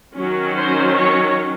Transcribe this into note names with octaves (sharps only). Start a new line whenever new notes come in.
D#3 F#3 C#4
C5
C#5